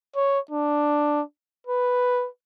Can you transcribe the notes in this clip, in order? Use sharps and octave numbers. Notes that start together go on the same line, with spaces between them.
C#5
D4
B4